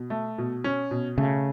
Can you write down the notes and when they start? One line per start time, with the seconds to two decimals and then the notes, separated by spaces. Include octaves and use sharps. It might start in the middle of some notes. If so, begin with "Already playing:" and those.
Already playing: B2
0.10 A3
0.38 B2
0.64 C#4
0.91 B2
1.18 C#3 A3